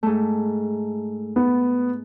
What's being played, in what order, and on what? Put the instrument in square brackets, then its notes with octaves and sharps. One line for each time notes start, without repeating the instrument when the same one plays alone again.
[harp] G#2 A3
[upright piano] B3